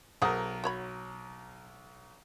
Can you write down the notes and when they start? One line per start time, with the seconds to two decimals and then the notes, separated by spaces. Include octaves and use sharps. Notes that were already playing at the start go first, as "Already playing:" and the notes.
0.22 B1 G#4 A#4 C5 F#5
0.64 F#4 C#5 B5